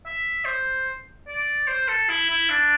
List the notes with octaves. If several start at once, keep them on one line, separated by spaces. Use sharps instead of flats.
E5
C5
D5
C5
A4
E4
E4
D4